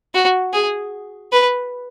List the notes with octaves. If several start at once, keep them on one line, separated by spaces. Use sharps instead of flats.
F#4
G#4
B4